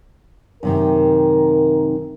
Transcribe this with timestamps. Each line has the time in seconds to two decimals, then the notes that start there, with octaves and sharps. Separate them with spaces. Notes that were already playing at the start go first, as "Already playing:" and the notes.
0.63 F#2 C3 D#3 A#4